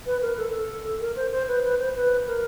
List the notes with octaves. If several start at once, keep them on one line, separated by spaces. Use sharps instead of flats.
B4
A#4
A4
A4
A#4
C5
C5
B4
B4
C5
B4
A#4